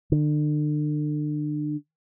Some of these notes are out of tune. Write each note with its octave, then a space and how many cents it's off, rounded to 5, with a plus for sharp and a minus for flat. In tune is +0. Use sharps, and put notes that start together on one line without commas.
D3 +35